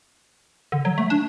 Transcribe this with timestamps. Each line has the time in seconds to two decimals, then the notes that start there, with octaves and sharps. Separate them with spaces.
0.72 D3
0.85 F#3
0.98 A3
1.10 D4